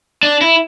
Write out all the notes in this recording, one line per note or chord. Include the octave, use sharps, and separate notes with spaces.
D4
E4